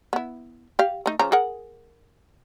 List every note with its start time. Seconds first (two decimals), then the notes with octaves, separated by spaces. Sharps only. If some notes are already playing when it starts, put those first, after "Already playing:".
0.13 B3 E4
0.79 G4 F5
1.06 A3 D#4
1.19 C#3 F3 A#5
1.32 G#4 A#4 F#5